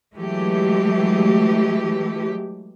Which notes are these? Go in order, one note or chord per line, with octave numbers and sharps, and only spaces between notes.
E3 F#3 G#3 A3 G4